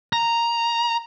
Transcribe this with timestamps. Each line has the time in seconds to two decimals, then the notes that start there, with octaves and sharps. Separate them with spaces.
0.13 A#5